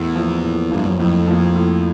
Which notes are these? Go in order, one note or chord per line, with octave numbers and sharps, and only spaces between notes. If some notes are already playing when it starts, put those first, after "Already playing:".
Already playing: E2 A2
F3 A#3
A2
G2 F3 A#3
F#2
F2 A2
F3 A#3
A2